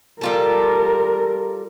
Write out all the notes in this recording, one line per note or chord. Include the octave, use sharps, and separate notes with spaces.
G3 F4 A4 A#4